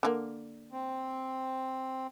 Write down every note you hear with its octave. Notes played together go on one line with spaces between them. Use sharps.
D3 F3 A#3
C4